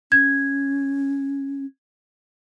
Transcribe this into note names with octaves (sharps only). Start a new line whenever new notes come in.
C#4 G#6